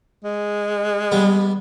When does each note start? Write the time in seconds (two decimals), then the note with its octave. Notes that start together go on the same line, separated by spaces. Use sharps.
0.24 G#3
1.12 G3 B3